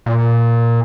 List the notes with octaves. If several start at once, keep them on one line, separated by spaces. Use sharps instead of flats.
A#2